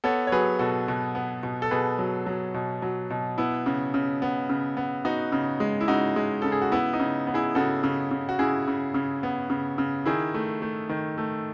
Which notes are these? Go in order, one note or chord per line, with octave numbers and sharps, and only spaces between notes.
B3 A4 C#5
C#5
F#3 G#4 B4
B2 F#4 A4
B2
B3
B2
A4
B2 G#4 B4
F#3
F#3
B2
F#3
B2
B3 E4
C#3
C#3
B3
C#3
B3
B3 D#4 F#4
C#3
G#3
E4
C#3 D#4 F#4
G#3
C#3 A4
G#4
F#4
B3 E4
D#4
C#3
B3
E4 G#4
C#3 F#4 A4
C#3
C#3
F#4
C#3 E4 G#4
C#3
C#3
B3
C#3
C#3
D#3 E4 G#4
A3
A3
D#3
A3